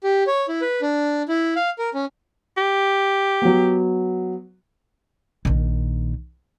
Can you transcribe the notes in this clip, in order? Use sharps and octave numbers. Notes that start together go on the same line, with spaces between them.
G4
C#5
E4
B4
D4
E4
F5
A#4
C#4
G4
F#3 B3
A#1 D#3